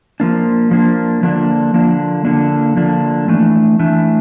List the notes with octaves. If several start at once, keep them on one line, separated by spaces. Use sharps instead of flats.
F3 A#3 D4
F3 A#3 D4
D3 F3 A#3 D4
D3 F3 A#3 D4
D3 F3 A#3 D4
D3 F3 A#3 D4
E3 A3 D4
E3 A3 D4